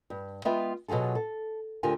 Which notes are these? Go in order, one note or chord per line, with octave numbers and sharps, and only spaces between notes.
G2
G#3 B3 F4 E5 G5
B2 F#3 F4 G#4 A4
A4
D2 D3 F4 G4 A#4 G#5